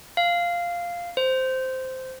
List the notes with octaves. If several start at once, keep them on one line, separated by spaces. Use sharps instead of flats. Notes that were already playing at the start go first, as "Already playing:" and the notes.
F5
C5